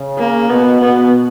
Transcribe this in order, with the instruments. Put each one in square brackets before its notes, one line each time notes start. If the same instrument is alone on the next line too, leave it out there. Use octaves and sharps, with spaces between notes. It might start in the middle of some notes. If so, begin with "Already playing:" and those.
Already playing: [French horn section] C#3
[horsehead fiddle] A#3
[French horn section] B2 [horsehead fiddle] B3
[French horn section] B2 [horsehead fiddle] B3